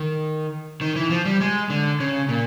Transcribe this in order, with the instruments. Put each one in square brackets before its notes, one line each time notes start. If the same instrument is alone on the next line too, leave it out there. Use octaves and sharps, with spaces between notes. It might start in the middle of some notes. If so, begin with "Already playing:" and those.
Already playing: [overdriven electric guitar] D#3
D#3
E3
F3
G3
G#3
D3
C#3
A#2